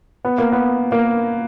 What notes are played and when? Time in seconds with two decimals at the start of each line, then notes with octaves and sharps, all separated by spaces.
0.25 B3
0.38 A#3
0.52 B3
0.92 A#3